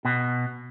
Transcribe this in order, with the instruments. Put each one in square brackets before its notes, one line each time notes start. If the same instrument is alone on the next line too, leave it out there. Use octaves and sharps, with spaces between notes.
[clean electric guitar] B2